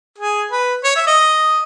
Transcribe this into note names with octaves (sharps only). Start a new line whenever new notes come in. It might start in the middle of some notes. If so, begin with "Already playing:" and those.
G#4
B4
C#5
E5
D#5